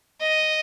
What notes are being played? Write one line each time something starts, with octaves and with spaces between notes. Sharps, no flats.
D#5